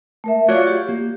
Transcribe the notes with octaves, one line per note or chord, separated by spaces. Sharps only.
A3 A#4 E5
F4 F#4 C#5 D5 F5
G4
A#3